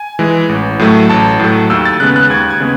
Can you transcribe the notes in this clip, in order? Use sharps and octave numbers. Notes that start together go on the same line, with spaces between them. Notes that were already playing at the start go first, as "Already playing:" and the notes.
Already playing: G#5
E3 G#3
A1
A2 F#3 A3
A1 A5
A2 F#3 A3
D#2 E6
A6
C#3 G#3 B3 F#6
F#6
D#2 G#6
G#6
C#3 G#3 B3